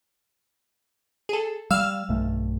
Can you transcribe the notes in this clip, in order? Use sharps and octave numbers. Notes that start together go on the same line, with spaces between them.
G#4 A4
G3 F5 E6 F6
B1 G2 A3